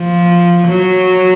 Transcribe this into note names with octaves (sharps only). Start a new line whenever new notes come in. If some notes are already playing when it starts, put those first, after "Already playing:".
Already playing: F3
F#3